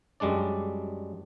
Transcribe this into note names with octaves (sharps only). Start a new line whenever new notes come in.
F#2 G3 G#3 D4 D5